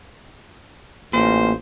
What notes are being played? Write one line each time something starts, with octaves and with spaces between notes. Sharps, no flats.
A1 A#2 C5